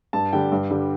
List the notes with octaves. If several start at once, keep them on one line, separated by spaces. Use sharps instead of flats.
G2 A5
D3 G3 G5
G2
D3 G3